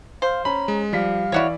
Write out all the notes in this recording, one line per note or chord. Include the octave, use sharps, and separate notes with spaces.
C5 F5
C#4 A#5 B5
G#3
F3 G3 D5 F5 B6
E3 E4 F#4 C#5 D5